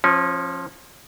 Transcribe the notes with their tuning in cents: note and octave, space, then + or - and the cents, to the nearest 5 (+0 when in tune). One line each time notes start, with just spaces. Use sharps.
F3 +5 C#4 -30